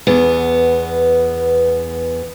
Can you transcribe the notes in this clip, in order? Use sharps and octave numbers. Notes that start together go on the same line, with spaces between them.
E2 B3